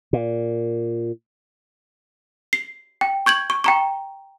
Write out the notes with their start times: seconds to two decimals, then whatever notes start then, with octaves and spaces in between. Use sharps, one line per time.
0.13 A#2
2.53 C7
3.01 G5
3.26 C#6 G6 G#6 F#7
3.50 C#6
3.64 G5 A#5 C#6